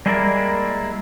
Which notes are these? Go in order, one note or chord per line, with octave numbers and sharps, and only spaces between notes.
G3 G#3 A#3 E4 A#4 D5